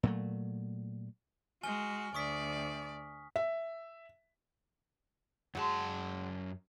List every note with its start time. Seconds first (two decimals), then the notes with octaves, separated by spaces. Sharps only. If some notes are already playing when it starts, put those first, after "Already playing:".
0.03 A#2 F#3 A3
1.64 G#3 F#4 G#5 F6 G7
2.14 D2 D5 C#6 D#6 B6
3.36 E5
5.55 F#2 F#3 G#3 A5